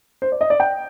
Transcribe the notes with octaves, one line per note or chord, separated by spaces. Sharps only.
C5
D5
D#5
D5
G5